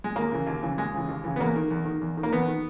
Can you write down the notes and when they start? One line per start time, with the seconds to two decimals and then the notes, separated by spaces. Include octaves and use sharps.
0.04 G#3
0.16 D#2 A#3
0.32 C#3 E3
0.47 D#2
0.62 C#3 E3
0.78 D#2 G#3
0.94 C#3 E3
1.09 D#2
1.24 C#3 E3
1.36 B3
1.40 E2 A#3
1.56 D#3
1.71 E2
1.85 D#3
2.01 E2
2.17 D#3
2.23 A#3
2.33 E2 B3
2.48 D#3